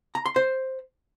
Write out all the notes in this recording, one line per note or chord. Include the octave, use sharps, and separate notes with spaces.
A#5
C6
C5